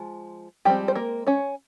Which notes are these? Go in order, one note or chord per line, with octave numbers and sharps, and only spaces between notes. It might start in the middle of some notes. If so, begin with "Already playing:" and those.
Already playing: F3 G#3
F3 G3 G#3 C4 G4
C5
A#3 A#4
C#4 C#5